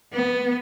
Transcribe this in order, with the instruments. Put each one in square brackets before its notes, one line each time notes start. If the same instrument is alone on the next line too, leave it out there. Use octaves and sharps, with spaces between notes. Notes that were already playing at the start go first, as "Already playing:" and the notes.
[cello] B3